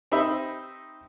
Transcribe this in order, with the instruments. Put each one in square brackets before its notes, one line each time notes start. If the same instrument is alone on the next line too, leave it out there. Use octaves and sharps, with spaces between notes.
[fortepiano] C4 D#4 G4 D#5 E5 B5